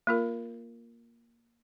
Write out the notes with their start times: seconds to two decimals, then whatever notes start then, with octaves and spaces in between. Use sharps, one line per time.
0.07 A#3 F4 A#4